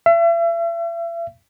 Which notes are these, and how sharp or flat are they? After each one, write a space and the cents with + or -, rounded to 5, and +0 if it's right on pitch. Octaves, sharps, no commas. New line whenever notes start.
E5 +40